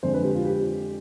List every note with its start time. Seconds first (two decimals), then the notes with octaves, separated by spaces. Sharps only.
0.03 F2 D3 G#3 C5
0.14 B4
0.24 G4
0.35 F4
0.45 G4